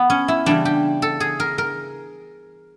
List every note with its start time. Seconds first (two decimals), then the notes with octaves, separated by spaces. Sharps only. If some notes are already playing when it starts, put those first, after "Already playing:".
Already playing: B3
0.10 C#4
0.28 E4
0.46 C#3 E3 G3 D4
0.65 G4
1.02 A4
1.20 G#4
1.40 A#4
1.58 A#4